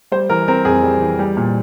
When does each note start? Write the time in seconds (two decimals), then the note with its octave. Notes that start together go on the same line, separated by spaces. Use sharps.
0.12 G3 C5
0.29 E3 A#4
0.48 C4 A#4
0.65 F2 G#4
0.83 G3
1.01 E3
1.19 G3
1.37 A#2